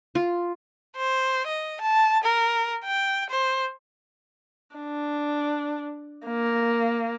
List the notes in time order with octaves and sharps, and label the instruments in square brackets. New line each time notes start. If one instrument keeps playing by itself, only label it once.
[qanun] F4
[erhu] C5
D#5
A5
A#4
G5
C5
[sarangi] D4
A#3